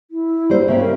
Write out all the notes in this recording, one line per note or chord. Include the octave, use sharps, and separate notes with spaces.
E4
G3 A#3 C5
C#3 A#3 C4 E5
A#4